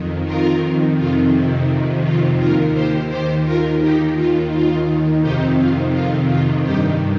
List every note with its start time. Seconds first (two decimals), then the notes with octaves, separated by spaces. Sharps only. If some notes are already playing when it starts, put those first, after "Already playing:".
Already playing: F2 D#3
0.26 F4 A#4
0.96 F2 C3 D#3 F4
2.03 F4
2.38 D#2 D#3 F4 A#4
2.73 G4 C5
3.09 G4 C5
3.44 F4 A#4
3.80 D#2 D#3 D#4 G4
4.16 F4
4.50 F4
5.21 F2 C3 D#3 D#4 G4
5.57 F4
5.93 F4
6.28 F4
6.63 G2 D#3 D#4 G4